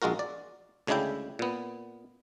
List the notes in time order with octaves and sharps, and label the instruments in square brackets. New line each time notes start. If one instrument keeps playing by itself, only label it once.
[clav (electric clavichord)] A#1 G#3 F4 F#4 A#4
D5
D2 C#3 G#3 D4 E4 G5
A#2 B3